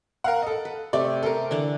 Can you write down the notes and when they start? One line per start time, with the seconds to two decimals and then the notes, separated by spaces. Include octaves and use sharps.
0.24 A#4 F5 F#5
0.42 A4 D#5
0.65 B4
0.93 C3 A3 D5
1.23 C3 A4 A#4 C5
1.51 D3 E3 D4